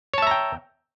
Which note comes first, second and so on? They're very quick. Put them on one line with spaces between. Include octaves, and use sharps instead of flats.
C#5 A5 E5 A#5 G5